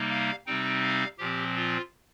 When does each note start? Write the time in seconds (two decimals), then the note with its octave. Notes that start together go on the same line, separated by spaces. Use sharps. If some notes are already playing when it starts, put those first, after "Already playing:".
Already playing: C3 G3 A#3 D#4
0.10 F5
0.46 C3 G3 C4 D#4 G5
0.83 F5
1.18 A#2 F3 C4 G4
1.56 F4